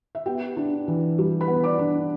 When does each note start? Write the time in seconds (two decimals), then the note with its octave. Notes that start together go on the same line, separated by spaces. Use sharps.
0.15 E5
0.26 B3 G4 G5
0.57 D4
0.88 E3
1.18 G3
1.41 B4 B5
1.48 B3
1.63 D5 D6
1.79 D4